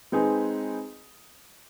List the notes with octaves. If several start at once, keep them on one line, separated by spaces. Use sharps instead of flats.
G#3 C4 D#4 G#4 B4